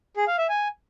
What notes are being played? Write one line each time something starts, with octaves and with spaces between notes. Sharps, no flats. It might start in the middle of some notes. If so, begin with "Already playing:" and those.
G#4
F5
E5
G#5